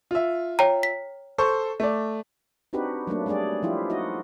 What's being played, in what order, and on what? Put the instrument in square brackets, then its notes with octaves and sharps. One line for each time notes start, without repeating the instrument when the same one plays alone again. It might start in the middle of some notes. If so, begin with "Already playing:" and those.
[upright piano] F4 E5
[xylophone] C#5 G5 A#5
B6
[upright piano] A4 C5 C#6
A3 D5
[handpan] C4 D4 D#4 F#4 G4 B4
F#3 A3 A#3 D4
G3 A3 D4 G#4 D5
F3 E4 F4 G4
D#4 F4 F#4 D#5